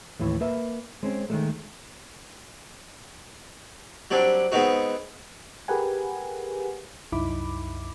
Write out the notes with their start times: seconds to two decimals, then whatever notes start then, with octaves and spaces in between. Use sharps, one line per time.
0.19 D#2 A2 E3
0.41 A#3 B4 E5
1.03 G#3 C4 C#4
1.30 D#3 G#3 A3
4.11 F#3 G3 C4 D4
4.52 G#3 B3 C4 D#4 F#4
5.68 G4 G#4 A#4 B4 F#5 G#5
7.12 C2 F#2 D#4 E4 B5 D6